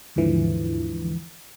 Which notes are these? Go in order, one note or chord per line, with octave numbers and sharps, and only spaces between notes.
D#2 G#2 D3 E3 F3